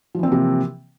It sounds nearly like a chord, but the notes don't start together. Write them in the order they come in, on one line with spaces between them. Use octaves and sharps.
F3 E3 C4 A#3 C3